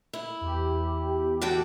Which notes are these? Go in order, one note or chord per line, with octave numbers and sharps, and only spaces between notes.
E4
E2 G4
F#4 A4 G5